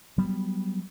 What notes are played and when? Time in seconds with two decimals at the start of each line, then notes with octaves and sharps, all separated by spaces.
0.18 F#3 G3 B3